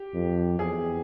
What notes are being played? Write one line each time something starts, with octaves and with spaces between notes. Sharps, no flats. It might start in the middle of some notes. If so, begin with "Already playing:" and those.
Already playing: G4
F2
E2 G#4